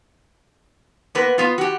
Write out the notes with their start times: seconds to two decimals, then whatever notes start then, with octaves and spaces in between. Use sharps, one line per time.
1.15 A#3 B3 B4
1.38 B3 F4
1.58 F#4 G4